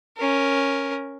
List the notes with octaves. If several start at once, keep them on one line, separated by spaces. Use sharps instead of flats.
C#4 A#4